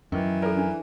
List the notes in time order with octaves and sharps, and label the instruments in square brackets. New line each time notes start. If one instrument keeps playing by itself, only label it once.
[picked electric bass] F#2 [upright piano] D#3 [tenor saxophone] E3
[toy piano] A4 D5 [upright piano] A#4
[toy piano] D4